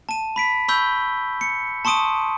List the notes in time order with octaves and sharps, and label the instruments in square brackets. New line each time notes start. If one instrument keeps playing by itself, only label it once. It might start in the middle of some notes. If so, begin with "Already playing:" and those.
[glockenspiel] A5 D#7
B5 B6 D7
B5 C#6 E6 G6 G7
C#7
A5 C6 C#6 D#6 D7 D#7